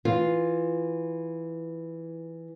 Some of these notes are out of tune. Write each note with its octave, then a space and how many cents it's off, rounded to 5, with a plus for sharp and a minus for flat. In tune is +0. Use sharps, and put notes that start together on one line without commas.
E3 +0 F4 +0